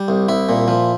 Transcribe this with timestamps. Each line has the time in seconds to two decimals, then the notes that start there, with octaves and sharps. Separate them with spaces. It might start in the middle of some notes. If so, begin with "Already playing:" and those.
Already playing: G3
0.08 C2
0.29 C2 E4
0.49 A#2
0.68 F3